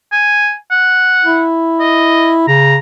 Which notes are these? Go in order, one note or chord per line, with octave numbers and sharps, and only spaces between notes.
G#5
F#5
E4
D#5
C#3 A#5